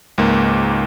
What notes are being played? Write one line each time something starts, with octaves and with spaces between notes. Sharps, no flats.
C#2 G#2 A#3